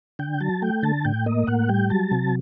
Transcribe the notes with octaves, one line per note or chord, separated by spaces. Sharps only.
D3 G5
F#3 A5
A3 G5
D3 A5
A2 G5
A#3 D#5
A2 F#5
G3 G5
F#3 A5
C3